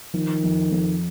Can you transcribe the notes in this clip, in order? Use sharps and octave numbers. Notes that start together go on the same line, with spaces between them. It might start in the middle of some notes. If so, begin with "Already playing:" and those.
D#3 F3
F2
F2